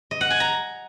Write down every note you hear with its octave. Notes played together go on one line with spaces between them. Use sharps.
D#5
F#5
G#5
A#5